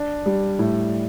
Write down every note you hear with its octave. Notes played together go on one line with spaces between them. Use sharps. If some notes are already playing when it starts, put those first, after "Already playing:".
Already playing: D4
G3
A2